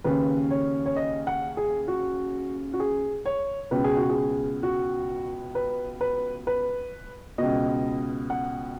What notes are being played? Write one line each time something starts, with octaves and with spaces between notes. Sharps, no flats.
D#2 C#3 B4
C#5
C#5
D#5
F#5
G#4
F#4
F#4
G#4
C#5
C#2 B2 B4
G#4
F#4
G#4
F#4
B4
B4
B4
C#2 B2 D#5
F#5